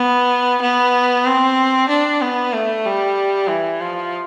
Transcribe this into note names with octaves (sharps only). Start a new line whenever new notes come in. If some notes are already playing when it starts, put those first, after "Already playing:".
Already playing: B3
B3
C4
D4
B3
A3
G3
E3
F3